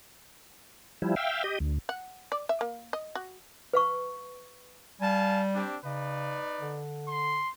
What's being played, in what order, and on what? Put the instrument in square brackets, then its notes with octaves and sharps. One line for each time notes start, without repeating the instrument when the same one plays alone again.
[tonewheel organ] F3 G3 E4
E5 F5 G5
G4 D#5
D2
[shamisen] F#5
D5
E5
A#3
D#5
F#4
[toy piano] B4 F5 C#6
[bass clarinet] G3 [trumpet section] F5 G#5 A5
[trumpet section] C4 D4 G4
[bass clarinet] C#3 [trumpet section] D#4 B4 D5
[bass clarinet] D3
[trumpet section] C6